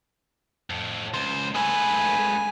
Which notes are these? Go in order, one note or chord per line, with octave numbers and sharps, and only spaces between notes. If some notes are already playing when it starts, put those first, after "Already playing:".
F2 A2
C#2 C5
G2 G#3 A3 B4 G#5